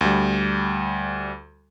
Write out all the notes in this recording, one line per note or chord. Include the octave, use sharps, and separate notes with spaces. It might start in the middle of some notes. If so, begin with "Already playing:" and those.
D2 G3